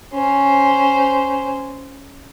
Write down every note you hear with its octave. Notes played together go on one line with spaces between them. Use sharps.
C#4 C5